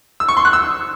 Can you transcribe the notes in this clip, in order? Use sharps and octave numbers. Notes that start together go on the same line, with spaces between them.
E6
C#6
C6
F#6
E6